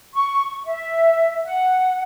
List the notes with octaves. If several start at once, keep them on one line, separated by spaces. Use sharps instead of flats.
C#6
E5
F#5